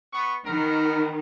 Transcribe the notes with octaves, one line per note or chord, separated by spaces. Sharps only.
B3 C#6
D#3 B3 A#4